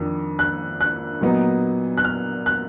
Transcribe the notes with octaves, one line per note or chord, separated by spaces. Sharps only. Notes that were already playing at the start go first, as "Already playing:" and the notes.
Already playing: F2 D#3 A#3 D4
F#6
F#6
A#2 F#3 B3 D#4
F#6
F6
F#6